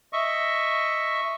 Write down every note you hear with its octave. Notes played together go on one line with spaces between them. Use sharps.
D#5 E5 C#6